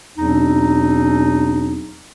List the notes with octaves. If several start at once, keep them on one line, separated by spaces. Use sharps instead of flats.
E2 B2 F#3 C4 D4 D#4